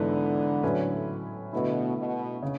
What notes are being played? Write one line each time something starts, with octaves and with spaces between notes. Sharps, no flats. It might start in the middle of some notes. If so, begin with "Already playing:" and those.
Already playing: G#2 D3 E3 B3 E4 B4
A2 F#3 C#4 E4 B4
B2 D3 A3 E4
B2
C#3